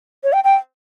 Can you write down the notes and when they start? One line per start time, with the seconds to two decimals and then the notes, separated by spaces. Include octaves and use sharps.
0.23 C#5
0.33 G5
0.44 G5